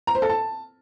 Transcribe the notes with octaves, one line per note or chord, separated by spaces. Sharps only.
A#5
C5
A4
A5